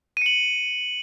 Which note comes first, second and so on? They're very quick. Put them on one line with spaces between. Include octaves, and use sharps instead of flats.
D#7 C#7 F#7